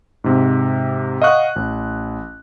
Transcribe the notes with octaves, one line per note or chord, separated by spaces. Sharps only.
G#2 C3
D#5 F5 F#5 C#6 F#6
A1